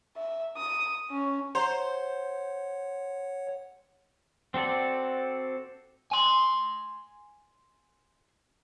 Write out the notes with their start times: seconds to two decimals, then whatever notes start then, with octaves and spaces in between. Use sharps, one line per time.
0.16 E5
0.57 D#6
1.11 C#4
1.55 C5 C#5 F#5 A#5 C6
4.54 C4 F#4 A4 D5
6.12 G#5 C6